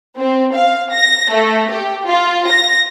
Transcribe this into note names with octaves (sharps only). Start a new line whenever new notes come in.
C4
F5
A#6
A3
G4
F4
A#6